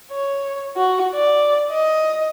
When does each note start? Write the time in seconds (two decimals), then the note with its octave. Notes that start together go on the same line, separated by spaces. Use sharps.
0.12 C#5
0.77 F#4
1.15 D5
1.70 D#5